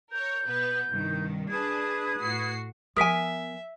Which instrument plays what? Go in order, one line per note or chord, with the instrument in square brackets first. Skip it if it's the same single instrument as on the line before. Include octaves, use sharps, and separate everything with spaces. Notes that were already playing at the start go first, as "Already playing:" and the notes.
[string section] A#4 C#5 [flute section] G6
[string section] B2 B3 B4
C2 G2 D#3
[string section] D4 G#4 A5 [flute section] B4 D#6 G#6
[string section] A2 F#4 C7
[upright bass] F3 B3 [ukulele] A#4 G#5 [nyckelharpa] E5 [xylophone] D#6 B6 D7